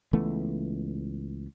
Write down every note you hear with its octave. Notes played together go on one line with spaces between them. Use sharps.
C#2 E3 A3 B3